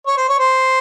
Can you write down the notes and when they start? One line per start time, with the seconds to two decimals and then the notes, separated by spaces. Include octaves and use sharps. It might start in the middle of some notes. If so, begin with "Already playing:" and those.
0.07 C#5
0.17 C5
0.29 C#5
0.39 C5